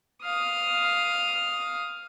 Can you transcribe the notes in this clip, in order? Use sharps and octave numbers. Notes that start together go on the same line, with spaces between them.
F5 D#6